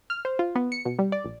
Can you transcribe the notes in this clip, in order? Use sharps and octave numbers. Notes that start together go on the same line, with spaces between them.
F6
C5
F4
B3
C#7
B2
G3
D5
A#1